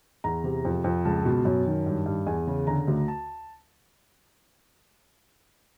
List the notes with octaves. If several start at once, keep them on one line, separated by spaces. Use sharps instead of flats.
E2 A#5
C3
F2
F2
C#2 A5
B2
F#2
D#3
G2
G2
E2 G#5
C#3
D3 A#5
D2
A5